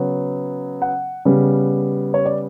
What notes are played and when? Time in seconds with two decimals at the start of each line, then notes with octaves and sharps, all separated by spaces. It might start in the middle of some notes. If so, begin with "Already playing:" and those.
Already playing: C#3 F#3 B3
0.82 F#5
1.25 C#3 G3 B3
2.14 C#5
2.26 D5